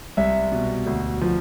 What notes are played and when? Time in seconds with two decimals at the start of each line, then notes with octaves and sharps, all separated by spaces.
0.17 C2 E5
0.52 B2
0.86 D2
1.21 F3